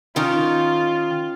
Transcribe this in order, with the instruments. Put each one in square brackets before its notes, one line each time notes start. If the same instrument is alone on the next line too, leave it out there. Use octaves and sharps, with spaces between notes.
[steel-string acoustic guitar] D#3 [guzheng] C#4 D#4 A#4 [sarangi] F4